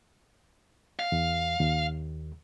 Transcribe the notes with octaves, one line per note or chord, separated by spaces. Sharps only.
F5
E2
D#2